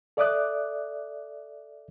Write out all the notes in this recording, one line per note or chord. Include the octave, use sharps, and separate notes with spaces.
A4 D5 E5 D6 D#6 F#6